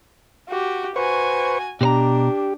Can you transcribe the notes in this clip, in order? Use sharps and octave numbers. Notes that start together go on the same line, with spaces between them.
F#4 G4
F#4 B4 C5 G#5 C#6
B2 D4 G4 C5 A#5